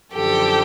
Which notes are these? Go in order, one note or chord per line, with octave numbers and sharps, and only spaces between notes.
F#2 D3 F3 G4 A4